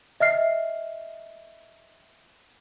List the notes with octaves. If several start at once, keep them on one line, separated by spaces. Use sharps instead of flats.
D#5 E5 F6 C7